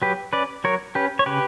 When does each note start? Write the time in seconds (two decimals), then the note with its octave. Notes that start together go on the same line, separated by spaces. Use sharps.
0.02 F#3 G4 B4
0.33 C#4 B4 D5
0.64 F#3 A#4 C#5
0.95 C#4 G4 B4
1.19 C#5
1.26 C#3 G4 B4